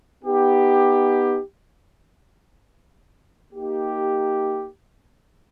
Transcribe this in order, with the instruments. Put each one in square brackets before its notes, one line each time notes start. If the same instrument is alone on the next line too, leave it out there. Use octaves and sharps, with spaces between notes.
[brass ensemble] B3 D#4 G4
A#3 D#4 G4